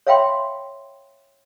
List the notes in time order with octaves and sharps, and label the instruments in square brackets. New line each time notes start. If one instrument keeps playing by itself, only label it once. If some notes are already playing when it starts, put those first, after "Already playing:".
[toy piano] C#5 E5 F5 G5 B5 C6